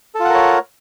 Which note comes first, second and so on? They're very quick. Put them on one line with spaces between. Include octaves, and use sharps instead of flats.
A4 F4 F#5 A#4 C#5